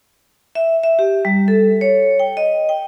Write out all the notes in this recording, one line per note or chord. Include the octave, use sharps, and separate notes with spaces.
E5
E5
G4
G3
A4
C#5
G5
D#5
G5